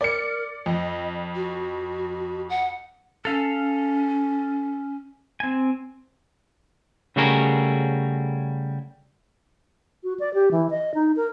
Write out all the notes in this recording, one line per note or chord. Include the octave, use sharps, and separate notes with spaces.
A#4 D5 C#7
F2 D#5
F#4
F#5
C#4 A4 F5
C4 G#5
C#3 G3 A3 F#4 G#4 A#4
F#4
D5
G4
E3
D#5
D#4
A#4